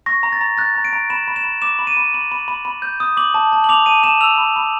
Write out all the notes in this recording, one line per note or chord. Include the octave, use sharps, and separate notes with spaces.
C#6 A#6
A#5
A6
A#5
F#6 A6
A#5
D7
A#5
B5 E7
B5
E7
B5
D6 E7
B5
D#7
B5
B5
B5
B5
B5
G6
D#6
D6 F#7
A5
A5
F#7
D6 F7
A5 D#7
A5 E7
E6 F7
B5
B5